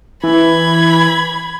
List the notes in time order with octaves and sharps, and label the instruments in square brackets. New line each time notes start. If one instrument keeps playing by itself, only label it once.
[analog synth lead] E3 [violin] B5 G#6